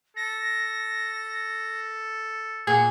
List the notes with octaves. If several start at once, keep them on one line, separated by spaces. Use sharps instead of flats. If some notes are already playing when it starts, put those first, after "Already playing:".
A4 A#6
A#2 G#4 F#5